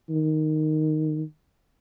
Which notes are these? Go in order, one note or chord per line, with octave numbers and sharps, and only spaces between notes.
D#3